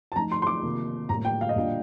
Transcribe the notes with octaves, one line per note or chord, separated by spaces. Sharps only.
A5
F3 A3 D#4 A#5
C6
C6
D6
C3 D#3 A#3 F4
A2 G3 A#3 A#5
G5
F5
D#5
A#2 G3 D4 F4 F5